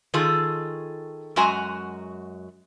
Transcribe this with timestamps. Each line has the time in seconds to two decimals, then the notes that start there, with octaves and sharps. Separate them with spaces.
0.14 D#3 F4 G#4 A4
1.36 F#2 G#3 F#4 G#5 A#5